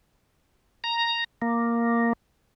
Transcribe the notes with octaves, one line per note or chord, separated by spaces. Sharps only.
A#5
A#3